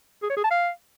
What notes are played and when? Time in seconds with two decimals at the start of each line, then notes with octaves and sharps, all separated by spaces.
0.23 G#4
0.30 C#5
0.37 G#4
0.44 A5
0.51 F5